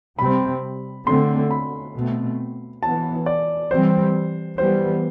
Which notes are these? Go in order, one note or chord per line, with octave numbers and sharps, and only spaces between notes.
C3 G3 C4 B5
D3 A3 C4 C6
B5
B2 A3 C4
E3 B3 A5
D5
E3 G3 C4 C5
E3 G3 B3 C5